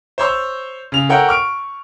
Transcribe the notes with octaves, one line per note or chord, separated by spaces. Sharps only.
C5 C#5 C6 E6
C#3 F7
A4 A#4 C#5 F#5 G5
C#6 F6 D7